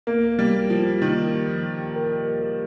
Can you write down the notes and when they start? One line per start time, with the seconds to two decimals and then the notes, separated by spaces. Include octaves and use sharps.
0.07 A#3 A#4
0.39 G3
0.55 G4
0.70 F3
1.01 D#3 A#3
1.48 F3
1.96 A#4
2.43 G4